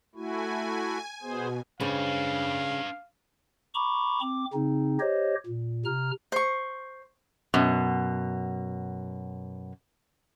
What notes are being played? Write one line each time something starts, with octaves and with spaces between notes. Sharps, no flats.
A3 E4 F#4 G#5
B2 B3 G#4 C5
C#3 D4 B4 C5 F5
A#5 B5 C#6 D6
C4 D6
C#3 C4 D#4
G4 C5 C#5 D#5
A#2
C3 A#5 F6
C5 C#6
F#2 B2